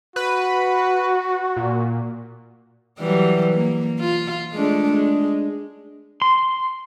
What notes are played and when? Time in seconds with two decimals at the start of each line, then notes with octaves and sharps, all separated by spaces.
0.16 F#4 B4
1.57 A#2
3.00 E3 F#3 G3
3.55 A#3
4.00 F4
4.53 G#3 A3 D4
4.92 G#3
6.22 C6